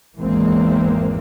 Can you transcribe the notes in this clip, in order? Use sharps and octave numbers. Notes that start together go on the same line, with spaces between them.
G#1 E2 E3 G#3 A#3 C4